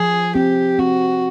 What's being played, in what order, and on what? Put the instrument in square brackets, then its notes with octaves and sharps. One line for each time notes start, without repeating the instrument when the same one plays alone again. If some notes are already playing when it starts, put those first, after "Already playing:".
Already playing: [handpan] F3 [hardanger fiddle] G#4
[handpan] C4 [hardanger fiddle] G4
[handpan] C4 [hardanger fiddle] F#4